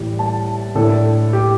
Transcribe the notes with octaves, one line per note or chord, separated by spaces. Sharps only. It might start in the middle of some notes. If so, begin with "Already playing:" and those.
Already playing: A2 E3 G3
A5
A2 A3 D4 A4
G4